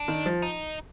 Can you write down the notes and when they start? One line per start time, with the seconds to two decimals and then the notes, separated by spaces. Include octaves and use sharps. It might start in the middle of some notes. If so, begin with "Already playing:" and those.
Already playing: D4
0.08 D#3
0.26 F3
0.42 D#4